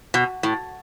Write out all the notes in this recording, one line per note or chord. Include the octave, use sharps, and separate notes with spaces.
B2
A2